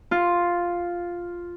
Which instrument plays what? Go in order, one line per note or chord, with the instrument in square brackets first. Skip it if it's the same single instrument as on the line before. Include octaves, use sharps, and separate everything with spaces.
[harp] F4